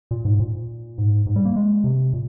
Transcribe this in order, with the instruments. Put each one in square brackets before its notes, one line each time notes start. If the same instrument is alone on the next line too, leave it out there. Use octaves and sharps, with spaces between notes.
[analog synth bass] A#2
G#2
A#2
G#2
G#2
G3
A#3
G#3
C3
A#2